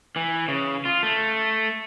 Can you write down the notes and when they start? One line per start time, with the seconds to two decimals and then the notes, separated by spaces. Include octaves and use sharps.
0.16 E3
0.48 C#3
0.85 F4
1.03 A3